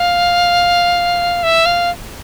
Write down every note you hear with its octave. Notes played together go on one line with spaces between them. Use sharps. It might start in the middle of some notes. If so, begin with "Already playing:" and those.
Already playing: F5
E5
F5